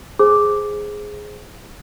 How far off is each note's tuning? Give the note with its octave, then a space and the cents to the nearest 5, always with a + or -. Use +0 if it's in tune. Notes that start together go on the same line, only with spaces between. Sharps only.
G#4 +0 C5 +0